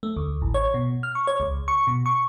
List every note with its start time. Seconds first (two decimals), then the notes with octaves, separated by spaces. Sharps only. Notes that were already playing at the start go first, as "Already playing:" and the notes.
0.03 A3
0.17 D2
0.42 A1
0.54 C#5
0.74 B2
1.03 F6
1.15 C#6
1.27 C#5
1.40 C#2
1.68 C#6
1.87 B2
2.06 C#6